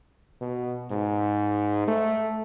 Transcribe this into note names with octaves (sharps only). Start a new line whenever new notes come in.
B2
G#2
A3